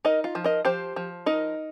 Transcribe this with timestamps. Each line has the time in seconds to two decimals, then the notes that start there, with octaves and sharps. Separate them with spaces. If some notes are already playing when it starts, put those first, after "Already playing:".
0.05 D#4 A#4 D#5
0.24 F4
0.35 F3
0.44 A#4 D#5
0.65 F3 G4 C5
0.96 F3
1.26 D#4 A#4 D#5